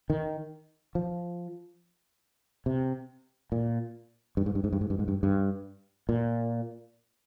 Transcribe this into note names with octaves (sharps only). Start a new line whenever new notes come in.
D#3
F3
C3
A#2
G2
G#2
G2
G#2
G2
G#2
G2
G#2
G2
G2
A#2